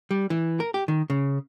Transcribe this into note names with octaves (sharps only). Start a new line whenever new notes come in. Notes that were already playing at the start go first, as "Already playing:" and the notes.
G3
E3
A#4
G4
D#3
C#3